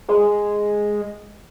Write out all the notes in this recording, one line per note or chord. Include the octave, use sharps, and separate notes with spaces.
G#3